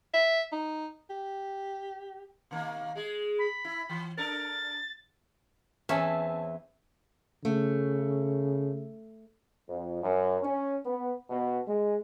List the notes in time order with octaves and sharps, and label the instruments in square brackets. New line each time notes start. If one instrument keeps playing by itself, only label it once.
[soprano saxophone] E5
D#4
G4
[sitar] B2 D#3 A#3
G#3 G#4
[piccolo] B5
[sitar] E4
E3
[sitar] D4 A4 A#4 [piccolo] A6
[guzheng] E2 E3 C4 [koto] C#4 [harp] E5 [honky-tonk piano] G#5 A5
[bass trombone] C#3 [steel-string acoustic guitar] A3
[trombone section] F2
F#2
C#4
B3
B2
G#3